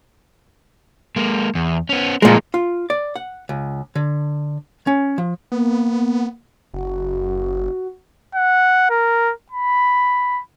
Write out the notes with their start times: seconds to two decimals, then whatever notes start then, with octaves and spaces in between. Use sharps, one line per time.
1.16 G#3 A#3
1.55 E2
1.89 B3 C#4
2.22 A#2 F3 G#3 A#4
2.54 F4
2.90 D5
3.16 F#5
3.49 C#2
3.95 D3
4.87 C#4
5.18 F3
5.52 A#3 B3
6.74 F#1 F#4
8.35 F#5
8.90 A#4
9.52 B5